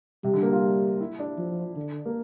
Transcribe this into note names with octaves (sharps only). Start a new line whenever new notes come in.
C3 G3
D3
A#3
F4
E4
D4
F3
D3
A#3